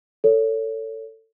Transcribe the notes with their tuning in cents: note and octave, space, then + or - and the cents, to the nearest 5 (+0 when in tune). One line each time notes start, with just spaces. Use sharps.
A4 +25 C#5 +15